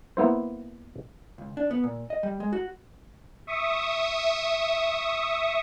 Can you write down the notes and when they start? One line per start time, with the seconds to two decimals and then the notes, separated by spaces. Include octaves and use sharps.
0.17 A#3 B3 E4 C5
1.38 C#2
1.57 D4
1.71 B3
1.84 A#2
2.10 D#5
2.23 G3
2.40 G#3
2.52 F#4
3.47 E5 C#6 D#6